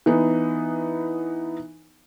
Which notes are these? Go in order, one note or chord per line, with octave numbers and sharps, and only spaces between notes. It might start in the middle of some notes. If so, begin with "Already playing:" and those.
E3 B3 D#4